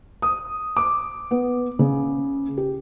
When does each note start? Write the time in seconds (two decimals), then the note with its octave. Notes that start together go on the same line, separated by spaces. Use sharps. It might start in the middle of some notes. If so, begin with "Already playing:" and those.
0.22 D#6
0.77 D6
1.31 B3
1.79 C#3
2.57 G4